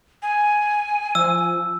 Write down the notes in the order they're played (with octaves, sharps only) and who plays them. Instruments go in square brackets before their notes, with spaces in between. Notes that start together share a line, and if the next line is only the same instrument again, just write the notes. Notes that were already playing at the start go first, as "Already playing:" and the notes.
[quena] G#5
[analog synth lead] F3 [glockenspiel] E6